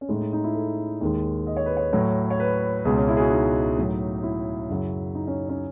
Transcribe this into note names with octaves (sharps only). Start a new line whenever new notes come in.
C#4
A2 G#3 D#4
D#4
D#4
E4
A4
D#2 D#3 G#3
D#5
C#5
B4
C#5
A2 F#3
C#5
B4
C#2 B2 G#3 G#4
C#4
E4
G#4
F#4
D#4
A2 F#3
E4
F#2 C#3 F#3
D#4
C#4
C#4